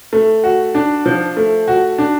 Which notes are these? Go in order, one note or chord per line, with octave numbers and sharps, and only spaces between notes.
A3
F#4
D4
F3
A3
F#4
D4